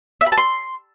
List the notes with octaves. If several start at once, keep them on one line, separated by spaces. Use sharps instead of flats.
E5
B5
A5
C6